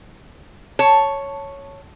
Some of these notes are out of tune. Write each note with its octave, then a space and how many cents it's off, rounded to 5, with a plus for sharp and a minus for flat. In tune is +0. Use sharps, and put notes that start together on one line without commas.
C#5 +0 A5 +0